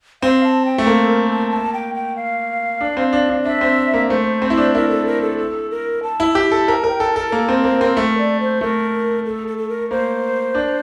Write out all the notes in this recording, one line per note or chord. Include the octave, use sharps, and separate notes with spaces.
C4 F5
A5
G5
A3
A#3 A4
A#4
A5
A5
G5
G5
F5
D4
C4
D4
D4
D4 E5
C4
A#3
A3 C5
C4
E4
D4
E4 A#4
A4
A#4
A4
A4
A#4
A5
E4
G4
A4
A#4 A5
A#4 G5
A4
A4 A#4
A#3 A4
C4 A#4
A#3 C5
C4 A#4
A3 A#4
D5
C5
A3 A#4
A4
A4
A4
A#4
A#3 C5
D4